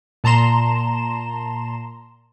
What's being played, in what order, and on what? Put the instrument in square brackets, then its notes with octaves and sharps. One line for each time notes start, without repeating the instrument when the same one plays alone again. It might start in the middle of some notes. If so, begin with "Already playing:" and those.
[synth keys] A#2 A5 A#5 C6 E7